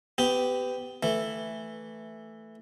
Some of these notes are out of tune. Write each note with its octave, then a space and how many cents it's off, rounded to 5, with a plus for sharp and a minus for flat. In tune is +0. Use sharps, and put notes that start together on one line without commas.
B3 +25 G4 +0
E3 +0 A3 +0